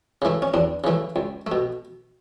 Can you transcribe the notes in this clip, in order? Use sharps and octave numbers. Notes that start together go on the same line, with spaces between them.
C#3 E3 A3
C#4
E2 D4
C#3 E3 A3
C#2
A3
B2